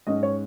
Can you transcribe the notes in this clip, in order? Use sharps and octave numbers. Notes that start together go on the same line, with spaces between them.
G#2 G#3 C#4 D#5
C#5